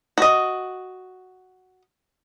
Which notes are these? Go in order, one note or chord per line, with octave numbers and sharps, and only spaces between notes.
F#4 D#5